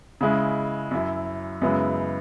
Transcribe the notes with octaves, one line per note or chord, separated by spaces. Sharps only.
C#3 G#3 E4
F#2 F#3 E4
F#2 C#3 G#3 B3 E4